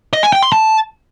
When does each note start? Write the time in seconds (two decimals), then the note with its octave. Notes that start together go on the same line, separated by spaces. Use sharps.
0.13 D#5
0.23 G#5
0.33 G5
0.43 C6
0.52 A5